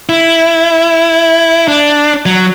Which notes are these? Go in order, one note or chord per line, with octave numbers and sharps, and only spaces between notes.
E4
D4
F#3